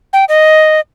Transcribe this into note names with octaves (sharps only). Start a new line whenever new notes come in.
G5
D#5